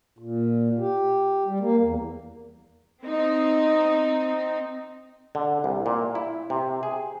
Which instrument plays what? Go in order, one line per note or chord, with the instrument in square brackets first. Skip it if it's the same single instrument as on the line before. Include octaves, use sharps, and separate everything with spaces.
[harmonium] A#2
G4
G3
A#3
E2
[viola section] C4 D#4
[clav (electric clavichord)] D3
C2
A#2
E4
C3
G#4